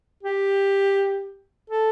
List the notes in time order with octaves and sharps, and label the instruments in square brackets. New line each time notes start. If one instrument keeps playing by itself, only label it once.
[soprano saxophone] G4
A4